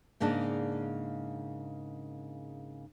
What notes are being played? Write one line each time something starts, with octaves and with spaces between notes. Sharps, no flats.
G#2 C#3 A#3 D4 D#5 A5